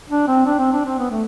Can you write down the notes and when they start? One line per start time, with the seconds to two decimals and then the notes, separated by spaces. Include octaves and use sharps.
0.10 D4
0.28 C4
0.46 D4
0.59 C4
0.73 D4
0.85 C4
0.99 B3
1.11 A3